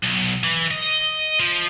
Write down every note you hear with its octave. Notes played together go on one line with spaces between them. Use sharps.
B1
E3
D#5
F3